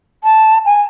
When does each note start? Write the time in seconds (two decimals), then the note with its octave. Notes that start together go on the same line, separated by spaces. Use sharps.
0.24 A5
0.66 G#5